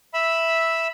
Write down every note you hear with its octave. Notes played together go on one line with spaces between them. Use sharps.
E5 B5 E6